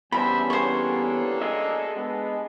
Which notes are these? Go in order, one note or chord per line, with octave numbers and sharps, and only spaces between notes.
E2 G3 B3 C#4 D4 C5 E5 B5
A#3 D4 A4 C5 C#5
G#4 D#5 E5
G#3 B3 D4